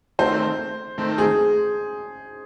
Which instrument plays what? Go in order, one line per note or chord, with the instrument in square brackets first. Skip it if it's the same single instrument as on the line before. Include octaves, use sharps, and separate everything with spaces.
[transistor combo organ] D#3 A3 C4 [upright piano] C5
[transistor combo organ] D#3 A3 C4
[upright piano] G#4